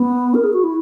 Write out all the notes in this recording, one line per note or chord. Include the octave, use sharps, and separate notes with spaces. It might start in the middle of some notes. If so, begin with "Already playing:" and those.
Already playing: B3
A#4
G#4
F#4
E4